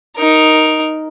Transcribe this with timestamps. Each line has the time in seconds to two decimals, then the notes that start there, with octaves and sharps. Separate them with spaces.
0.17 D#4 A#4